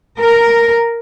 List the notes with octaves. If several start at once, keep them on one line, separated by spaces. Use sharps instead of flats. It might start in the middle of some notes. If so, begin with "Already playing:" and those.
A#4